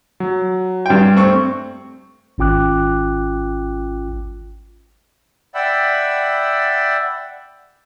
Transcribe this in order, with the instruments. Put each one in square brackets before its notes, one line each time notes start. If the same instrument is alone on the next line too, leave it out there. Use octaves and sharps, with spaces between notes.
[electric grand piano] F#3
[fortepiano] G2 G5
[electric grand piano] A3 C4 C#6
[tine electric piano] G#1 C#4 F4 G5 D6 F#6
[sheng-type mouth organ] D5 E5 F#5 G5 B5 E6